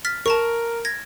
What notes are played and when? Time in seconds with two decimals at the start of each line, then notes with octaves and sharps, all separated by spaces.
0.05 F6 A6 B6
0.26 A#4 A5 A#5 C#6
0.85 G#6 A#6